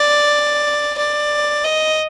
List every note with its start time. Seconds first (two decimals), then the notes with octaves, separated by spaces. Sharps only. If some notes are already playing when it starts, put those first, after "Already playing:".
Already playing: D5
0.98 D5
1.64 D#5